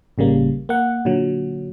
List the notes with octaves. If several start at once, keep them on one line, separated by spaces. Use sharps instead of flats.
A1 C#3 G3 A#3
A#3 F#5
A#2 D3 F#3